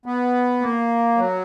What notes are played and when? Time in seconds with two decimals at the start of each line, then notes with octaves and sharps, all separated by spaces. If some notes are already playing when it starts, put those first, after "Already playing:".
0.06 B3
0.62 A#3
1.17 F#3